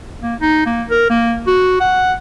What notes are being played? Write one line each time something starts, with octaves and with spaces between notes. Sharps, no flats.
A#3
D#4
A#3
A#4
A#3
F#4
F#5